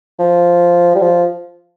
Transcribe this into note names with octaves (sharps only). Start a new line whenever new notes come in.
F3
G3
F3